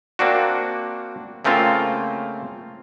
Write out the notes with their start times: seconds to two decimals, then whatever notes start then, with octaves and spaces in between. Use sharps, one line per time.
0.19 A#3 C4 D4 F#4
1.45 C#3 A3 A#3 C4 F4